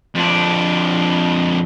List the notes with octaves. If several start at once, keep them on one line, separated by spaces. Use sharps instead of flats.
F2 D4